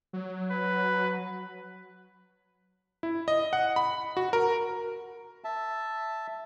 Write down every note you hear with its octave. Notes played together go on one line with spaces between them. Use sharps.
F#3
B4
E4
D#5
F#5
B5
F#4
A#4
E5 A5